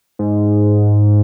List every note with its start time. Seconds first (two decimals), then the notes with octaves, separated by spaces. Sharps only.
0.19 G#2